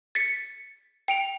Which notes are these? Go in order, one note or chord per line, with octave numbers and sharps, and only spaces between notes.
A6 B6 C#7
G5 D7 F7